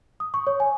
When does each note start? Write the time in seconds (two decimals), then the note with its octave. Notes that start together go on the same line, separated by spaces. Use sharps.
0.20 D#6
0.34 C#6
0.47 C#5
0.60 G#5